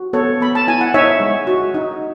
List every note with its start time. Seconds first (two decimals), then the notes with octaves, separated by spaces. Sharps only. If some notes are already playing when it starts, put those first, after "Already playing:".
Already playing: F#4
0.13 B3 A4 C#5
0.40 B3 B5
0.55 A5
0.68 E4 G#5
0.81 F#5
0.94 D#4 C#5 E5
1.20 G#3
1.47 F#4
1.74 D#4